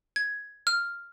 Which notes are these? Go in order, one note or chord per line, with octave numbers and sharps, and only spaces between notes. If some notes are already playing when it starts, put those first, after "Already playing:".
G#6
F6